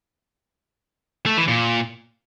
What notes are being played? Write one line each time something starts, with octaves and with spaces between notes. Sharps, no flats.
A3
E3
A#2